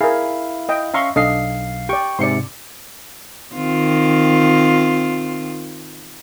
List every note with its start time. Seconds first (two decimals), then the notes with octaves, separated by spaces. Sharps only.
0.01 E4 G#4 A#4 F5
0.69 D#5 G5
0.94 C#4 E5 F5 A#5 C6 C#6
1.16 B1 D4 A4 D#5 F5 C7
1.89 G4 D5 G5 C#6
2.19 G#2 C3 D5 C6 C#7
3.56 D#3 C4 F4